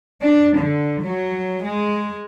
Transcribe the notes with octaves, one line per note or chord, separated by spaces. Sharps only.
D4
D3
F#3
G#3